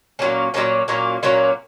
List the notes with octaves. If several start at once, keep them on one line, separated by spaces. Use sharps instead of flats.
A#2 F#3 A#3 C#4
A#2 F#3 A#3 C#4
A#2 F#3 A#3 C#4
A#2 F#3 A#3 C#4